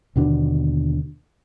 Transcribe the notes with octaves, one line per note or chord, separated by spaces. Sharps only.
D#2 B2 D3 D4